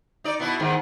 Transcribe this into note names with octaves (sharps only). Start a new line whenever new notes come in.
D#4 D5
B2 B3 E4
E2 G#2 D#3